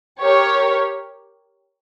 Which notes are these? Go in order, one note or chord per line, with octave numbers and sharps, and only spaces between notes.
G4 A#4 C#5